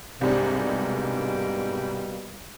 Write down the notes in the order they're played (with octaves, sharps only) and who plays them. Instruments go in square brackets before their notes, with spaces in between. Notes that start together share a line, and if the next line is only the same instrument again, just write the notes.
[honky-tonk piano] C2 G#2 D4 [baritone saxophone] C3 [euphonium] G3 [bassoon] A#3
[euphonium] B2 [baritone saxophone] G3